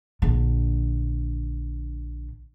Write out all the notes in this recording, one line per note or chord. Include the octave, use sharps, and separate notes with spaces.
A#1 D3